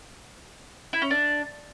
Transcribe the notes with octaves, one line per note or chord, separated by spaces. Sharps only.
E4
C#4
D4